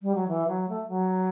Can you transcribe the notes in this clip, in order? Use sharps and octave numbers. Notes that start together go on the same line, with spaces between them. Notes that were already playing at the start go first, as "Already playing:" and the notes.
G3
F#3
E3
F#3
A3
F#3